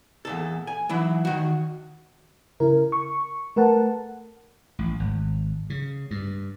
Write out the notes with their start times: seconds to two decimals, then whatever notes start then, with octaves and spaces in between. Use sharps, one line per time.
0.25 E2 A#2 A4
0.67 G#5
0.89 E3 F#3 E4
1.25 D#3 F#4
2.60 C#3 E4 A#4
2.92 C#6
3.56 A3 A#4 B4 F#5 A5
4.79 A1
5.00 G#1
5.70 C#3
6.11 G2